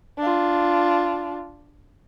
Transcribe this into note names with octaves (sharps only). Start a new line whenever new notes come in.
D4 F4